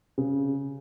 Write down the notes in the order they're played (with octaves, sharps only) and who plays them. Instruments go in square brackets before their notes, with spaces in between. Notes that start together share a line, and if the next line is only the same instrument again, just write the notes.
[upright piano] C#3